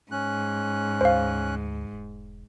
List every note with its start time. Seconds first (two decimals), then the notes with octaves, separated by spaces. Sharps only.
0.11 G#2 C#4 F#6
1.01 D2 C5 F5
1.92 E1